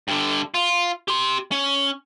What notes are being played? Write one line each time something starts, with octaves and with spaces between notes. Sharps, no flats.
G2 D3
F4
G4 C6
C#4